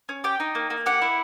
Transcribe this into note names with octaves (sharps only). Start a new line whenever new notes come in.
C#4
G4 G5
D#4
A#3
A#3
G4 F#5
E4